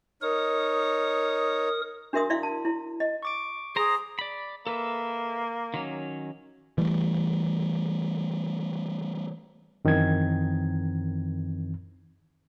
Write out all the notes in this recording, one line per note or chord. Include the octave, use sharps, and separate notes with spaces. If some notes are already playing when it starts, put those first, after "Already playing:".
D#4 A#4 C#5 D#6
D4 F#4 A#4 E5 C6 D#6
E4 D5 E5 F5 C6
A5
E4
D#5
C#6 D6 D7
G#4 C5 A#5
D5 B5
A#3 A4 B4 E5
D#3 F#3 C#4
E3 G3 A3
F#2 D#3 E3 C4 G#6